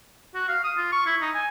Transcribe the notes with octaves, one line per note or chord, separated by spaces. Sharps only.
F#4
F5
D#6
F4
C#6
E4
D#4
G#5